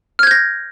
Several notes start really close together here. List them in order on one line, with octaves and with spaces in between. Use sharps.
F6 G#6 G6 A#6